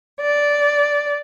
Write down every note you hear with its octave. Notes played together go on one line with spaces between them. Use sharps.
D5